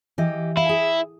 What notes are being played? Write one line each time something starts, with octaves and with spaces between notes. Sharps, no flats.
E3 G4 D#5
E4 F5
G#4